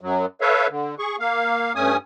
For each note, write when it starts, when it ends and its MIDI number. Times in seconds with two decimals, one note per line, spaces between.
0.01 0.26 42
0.01 0.26 54
0.41 0.67 69
0.41 0.67 71
0.41 0.67 73
0.41 0.67 76
0.41 0.67 77
0.69 0.95 50
0.99 1.16 68
0.99 1.16 85
1.20 1.73 58
1.20 1.73 77
1.76 1.97 43
1.76 1.97 57
1.76 1.97 61
1.76 1.97 80
1.76 1.97 87